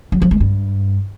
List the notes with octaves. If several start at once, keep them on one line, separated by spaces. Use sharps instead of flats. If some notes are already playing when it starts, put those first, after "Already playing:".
F#3
F3
G#3
G2